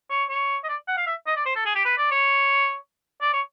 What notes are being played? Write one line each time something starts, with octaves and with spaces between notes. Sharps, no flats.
C#5
C#5
D#5
D5
F#5
F5
E5
D#5
D5
C5
A4
G#4
G4
B4
D5
C#5
D5
C#5